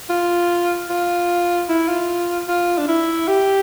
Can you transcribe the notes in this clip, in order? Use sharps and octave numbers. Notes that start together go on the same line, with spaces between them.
F4
F4
E4
F4
F4
D4
E4
G4